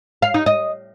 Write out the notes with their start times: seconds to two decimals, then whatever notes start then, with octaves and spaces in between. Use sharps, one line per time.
0.22 F5
0.34 D#4
0.46 D#5